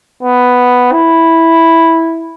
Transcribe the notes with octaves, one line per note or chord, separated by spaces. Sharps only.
B3
E4